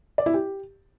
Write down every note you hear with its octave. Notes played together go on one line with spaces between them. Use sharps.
D5
E4
G4